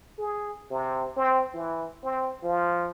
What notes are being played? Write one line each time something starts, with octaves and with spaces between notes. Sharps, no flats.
G#4
C3
C4
E3
C4
F3